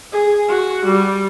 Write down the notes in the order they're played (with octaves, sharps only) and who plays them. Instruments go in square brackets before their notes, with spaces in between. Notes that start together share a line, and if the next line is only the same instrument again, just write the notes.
[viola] G#4
F#4
G3